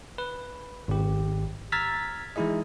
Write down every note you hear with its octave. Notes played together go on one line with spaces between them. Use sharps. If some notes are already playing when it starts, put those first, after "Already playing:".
B4
G#1 G4
A#5 E6 F6 G#6 A6 B6
E3 G#3 D#4 E4 G#4 D#5